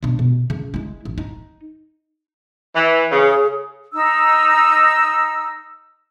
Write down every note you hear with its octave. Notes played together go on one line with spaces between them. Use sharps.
B2 D4
B2
C#3
G#3 E4
A1
D#4
E3
C#3 G#4
D#4 E6